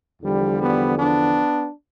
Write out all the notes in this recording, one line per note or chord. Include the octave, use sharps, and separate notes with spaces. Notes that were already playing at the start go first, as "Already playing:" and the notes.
E2 D3 F3 G3
G3 B3
B3 D4